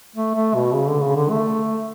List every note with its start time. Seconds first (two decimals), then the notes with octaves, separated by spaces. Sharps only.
0.16 A3
0.35 A3
0.55 B2
0.73 C#3
0.87 D3
1.02 C#3
1.16 D3
1.30 A3